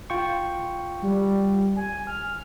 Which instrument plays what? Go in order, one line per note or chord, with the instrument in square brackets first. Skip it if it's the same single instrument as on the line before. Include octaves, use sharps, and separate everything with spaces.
[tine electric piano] F4 G5 C#6
[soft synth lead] G3
G#5
F6